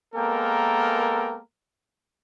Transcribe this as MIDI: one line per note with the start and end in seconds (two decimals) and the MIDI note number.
0.15 1.39 56
0.15 1.39 58
0.15 1.39 59
0.15 1.39 69
0.15 1.39 70
0.15 1.39 79